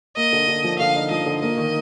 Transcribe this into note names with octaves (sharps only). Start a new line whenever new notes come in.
A#3 D#5
D3
D3
F3
D3 F5
D#4
F3 D#5
D3
A#3 D#5
D#3